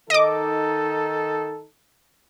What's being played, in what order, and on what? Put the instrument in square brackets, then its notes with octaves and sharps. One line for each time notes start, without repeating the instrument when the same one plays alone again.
[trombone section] D#3 D#4 A4 [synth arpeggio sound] D#5 D6